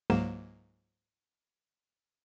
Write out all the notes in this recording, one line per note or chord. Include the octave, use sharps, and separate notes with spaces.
C#2 G#2 F#3 A#3 E7